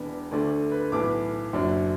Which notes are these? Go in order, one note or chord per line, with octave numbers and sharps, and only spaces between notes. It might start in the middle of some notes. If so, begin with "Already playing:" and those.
Already playing: E1 E2 E3 B3 D4
D2 D3 A3 D4
B4
B1 A2 E3 B3 D6
F#1 F#2 F#3 D4